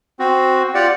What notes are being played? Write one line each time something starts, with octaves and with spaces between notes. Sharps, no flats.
C4 F#4
F4 G4 D5 F#5